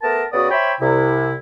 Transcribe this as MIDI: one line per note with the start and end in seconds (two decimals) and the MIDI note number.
0.03 0.23 57
0.03 0.23 59
0.03 0.23 70
0.03 0.23 81
0.33 0.48 49
0.33 0.48 59
0.33 0.48 66
0.33 0.48 74
0.33 0.48 87
0.51 0.73 72
0.51 0.73 73
0.51 0.73 76
0.51 0.73 79
0.51 0.73 83
0.80 1.35 36
0.80 1.35 48
0.80 1.35 64